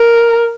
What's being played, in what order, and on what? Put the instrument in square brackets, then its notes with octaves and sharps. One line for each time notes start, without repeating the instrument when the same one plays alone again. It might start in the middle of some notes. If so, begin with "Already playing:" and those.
Already playing: [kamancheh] A#4